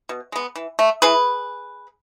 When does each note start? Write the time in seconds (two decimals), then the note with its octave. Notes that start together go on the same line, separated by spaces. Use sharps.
0.09 B2
0.32 G#3 B3
0.56 E3
0.79 A3
1.02 E3 G#4 B4